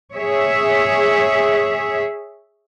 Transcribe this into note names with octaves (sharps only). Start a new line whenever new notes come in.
G#4 C#5 E5